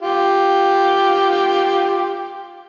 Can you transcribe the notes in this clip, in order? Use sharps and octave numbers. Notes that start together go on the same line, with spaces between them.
F4 G4